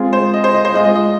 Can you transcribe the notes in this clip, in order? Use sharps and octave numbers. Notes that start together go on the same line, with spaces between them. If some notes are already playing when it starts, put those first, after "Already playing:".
Already playing: G#3 C4 F4 G#4
C5
D#5
C5
D#5
C5
G#3 F4 G#4 D#5
D#5
D#5